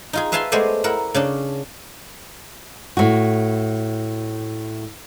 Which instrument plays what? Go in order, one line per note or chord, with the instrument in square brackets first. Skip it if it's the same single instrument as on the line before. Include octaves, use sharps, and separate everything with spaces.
[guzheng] D#4 F4 G#4
B4 E5 F5 G#5 A5 C6
G#3 A3 B3 C5 D5 G#5
E4 A#4 F#5
C#3 C#4 D4
[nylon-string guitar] A2 F#4